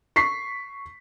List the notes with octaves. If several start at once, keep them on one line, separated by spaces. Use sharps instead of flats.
C#6 B6 C7